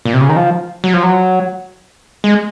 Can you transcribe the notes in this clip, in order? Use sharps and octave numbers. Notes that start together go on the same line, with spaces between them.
A#2
C3
C#3
D#3
F3
F#3
F3
F#3
G#3